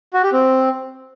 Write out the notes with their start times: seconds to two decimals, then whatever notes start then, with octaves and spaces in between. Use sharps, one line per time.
0.13 F#4
0.23 G4
0.33 C4